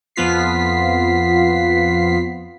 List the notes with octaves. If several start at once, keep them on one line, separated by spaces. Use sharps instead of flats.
F2 F3 B3 F4 B6 C7